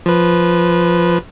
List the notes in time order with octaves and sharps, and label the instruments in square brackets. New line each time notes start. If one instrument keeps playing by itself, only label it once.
[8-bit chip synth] F3 B4